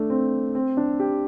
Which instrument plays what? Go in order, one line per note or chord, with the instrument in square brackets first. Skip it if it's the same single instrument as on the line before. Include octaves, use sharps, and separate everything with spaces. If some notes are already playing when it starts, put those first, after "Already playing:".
Already playing: [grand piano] A3 D4
C4
C4
D4
G4